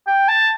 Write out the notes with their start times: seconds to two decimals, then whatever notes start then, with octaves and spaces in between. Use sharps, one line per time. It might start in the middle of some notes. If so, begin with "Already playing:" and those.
0.07 G5
0.28 A5